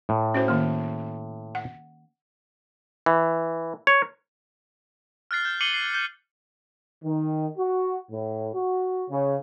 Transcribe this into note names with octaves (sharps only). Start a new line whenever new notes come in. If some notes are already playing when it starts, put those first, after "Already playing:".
A2
C#4 F#4 C5
D#3 A#3
F#5
E3
C#5
F6 F#6 A6 C7
G6
D6 C7 C#7 D#7 F#7 G7
C7
G6
D#3
F#4
A2
F#4
C#3